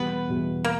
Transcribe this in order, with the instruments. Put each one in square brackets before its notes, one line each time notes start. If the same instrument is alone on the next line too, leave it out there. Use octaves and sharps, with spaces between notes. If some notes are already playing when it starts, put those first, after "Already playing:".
Already playing: [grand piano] E2 B2 G3 [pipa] B3 B4
[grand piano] E2 B2 G3
[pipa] A#3